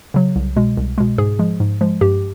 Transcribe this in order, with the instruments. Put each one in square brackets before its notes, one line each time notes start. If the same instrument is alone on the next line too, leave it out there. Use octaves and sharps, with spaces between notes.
[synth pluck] C#3 F#3
C2
B2 G#3
C2
B2 G#3
G#2 G#4
F3 G#3
G#2
F3 G#3
G2 G4